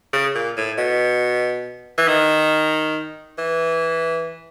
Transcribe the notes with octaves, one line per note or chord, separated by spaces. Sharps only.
C#3
A#2
A2
B2
E3
D#3
E3